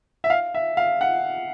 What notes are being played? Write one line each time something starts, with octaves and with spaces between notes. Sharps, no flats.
E5
F5
E5
F5
F#5